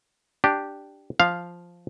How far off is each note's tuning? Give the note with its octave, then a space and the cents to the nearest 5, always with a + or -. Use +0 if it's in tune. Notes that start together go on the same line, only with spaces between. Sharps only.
D4 +0 G4 +0
F3 +0 F5 +0